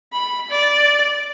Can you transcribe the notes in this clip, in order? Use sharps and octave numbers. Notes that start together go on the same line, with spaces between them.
B5
D5